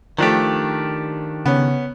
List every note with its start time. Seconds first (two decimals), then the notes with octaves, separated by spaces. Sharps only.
0.18 D#3 F3 A3 D4 G4
1.46 C#3 B3 C#4